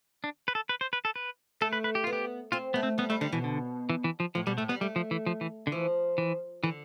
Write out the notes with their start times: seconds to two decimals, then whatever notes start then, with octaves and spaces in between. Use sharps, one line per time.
0.24 D4
0.48 B4
0.55 A4
0.69 B4
0.81 C5
0.93 B4
1.05 A4
1.16 B4
1.61 A3 A4
1.73 B4
1.84 B4
1.95 G4
2.04 B3 F4
2.13 G4
2.52 C4 F4
2.74 A3 B3
2.83 C4
2.98 G3 B3
3.10 G3 A3
3.21 D3 G3
3.32 B2 E3
3.44 D3
3.90 E3
4.04 E3
4.20 F3
4.35 A2 F3
4.47 B2 G3
4.58 A2 A3
4.69 G3 B3
4.81 G3 A3
4.96 F3
5.11 E3
5.26 F3
5.41 E3
5.67 D3
5.72 E3 F3
6.18 E3
6.64 D3 E3